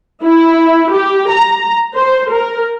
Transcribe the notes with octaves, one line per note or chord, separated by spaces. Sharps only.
E4
G4
A#5
C5
A#4